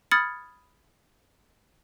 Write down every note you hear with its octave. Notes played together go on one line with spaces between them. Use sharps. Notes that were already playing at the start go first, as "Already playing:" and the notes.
B5 D#6 F6 G#6 A6 C#7